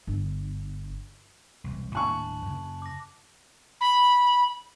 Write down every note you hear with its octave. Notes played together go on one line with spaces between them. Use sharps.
G1
E1 C2
D#1 A2 D4 G#5 A5 C#6 F#6 F#7
F#2 C#3
D6 A#6
B5